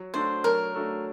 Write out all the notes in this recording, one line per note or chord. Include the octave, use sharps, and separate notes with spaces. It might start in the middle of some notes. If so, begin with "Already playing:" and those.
Already playing: F#3
A3 D4 F#4 A4 C5
F#3 A#4
A3 D4 F#4 A4